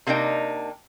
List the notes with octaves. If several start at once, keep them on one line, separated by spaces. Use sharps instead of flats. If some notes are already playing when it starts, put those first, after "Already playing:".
C3 A#3 D4 D#4 G5